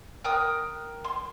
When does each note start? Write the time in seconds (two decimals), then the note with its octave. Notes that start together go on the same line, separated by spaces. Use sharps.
0.24 A#4 G5 D#6 F#6
1.05 C6